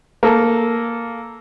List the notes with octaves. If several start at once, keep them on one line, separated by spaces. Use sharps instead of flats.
A#3 A4